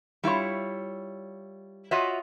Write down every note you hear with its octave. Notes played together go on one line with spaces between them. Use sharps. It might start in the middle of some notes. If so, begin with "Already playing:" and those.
G3 E4 F4 C#5
F4 F#4 C#5 D#5 E5